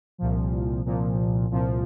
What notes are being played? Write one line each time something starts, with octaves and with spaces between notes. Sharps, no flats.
C2 A#2 F3
C2 A#2 F3
C2 A#2 F3